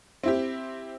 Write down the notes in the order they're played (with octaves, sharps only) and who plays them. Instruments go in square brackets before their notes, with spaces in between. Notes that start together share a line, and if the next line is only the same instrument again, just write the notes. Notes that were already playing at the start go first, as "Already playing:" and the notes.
[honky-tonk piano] C4 E4 G4